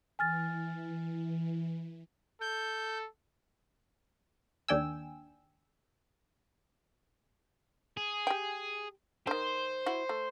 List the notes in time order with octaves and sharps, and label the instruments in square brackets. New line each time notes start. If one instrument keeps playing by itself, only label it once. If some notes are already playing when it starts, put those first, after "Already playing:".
[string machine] E3 [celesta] G#5 F6 A6
[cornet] A4 [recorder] G6
[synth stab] D#2 D4 G5 G#5 E6
[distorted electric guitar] G#4
[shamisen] G4 G5
[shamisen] D3 D#3 [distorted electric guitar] C5
[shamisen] E4 F#4
A3